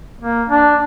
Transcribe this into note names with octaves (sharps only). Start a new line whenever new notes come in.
A#3
D4